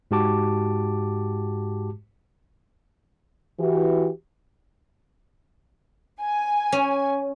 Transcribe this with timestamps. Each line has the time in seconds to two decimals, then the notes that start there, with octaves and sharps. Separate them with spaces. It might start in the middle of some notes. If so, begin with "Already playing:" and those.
0.11 G#2 G#3 F#4 G4 A5 D6
3.59 E3 F#4 G4
6.21 G#5
6.72 C#4